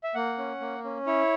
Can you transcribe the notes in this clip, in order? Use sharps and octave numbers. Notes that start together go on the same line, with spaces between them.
E5
A#3 F#5
C#4
A#3
C#4
E4 C#5